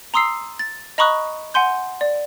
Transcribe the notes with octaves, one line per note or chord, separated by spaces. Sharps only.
A#5 C6 D#6 E6 C7
A6
D#5 A#5 B5 C#6 D#6 F#6
F#5 G#5 C6 G6
D5